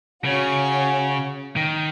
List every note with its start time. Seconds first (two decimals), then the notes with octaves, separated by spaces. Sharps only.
0.25 C#3 C#4 F#4 C#5
1.56 D#3